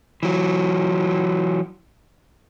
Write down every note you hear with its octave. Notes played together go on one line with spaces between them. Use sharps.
E3 F#3